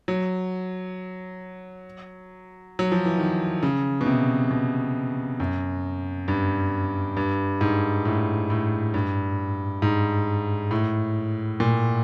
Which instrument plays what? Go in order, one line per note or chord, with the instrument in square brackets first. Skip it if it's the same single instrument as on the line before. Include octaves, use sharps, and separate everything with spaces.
[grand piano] F#3
F#3
F3
E3
D#3
C#3
B2
C3
B2
F#2
G2
G2
G#2
A2
A2
G2
G#2
A2
A#2